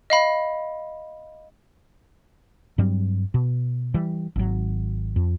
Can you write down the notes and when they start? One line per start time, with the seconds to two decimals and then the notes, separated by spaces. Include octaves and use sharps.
0.10 D#5 F5 B5
2.78 G2 F#3 G3 C4
3.34 B2
3.94 E3 G3
4.36 G#1 F#3
5.16 F2